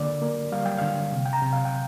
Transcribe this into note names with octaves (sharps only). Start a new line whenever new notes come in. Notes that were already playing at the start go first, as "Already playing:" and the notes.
Already playing: D3 A#3 D5
A#3
G3 F5
G5
D3 F5
C3
G5
A#5
C3
F5
G5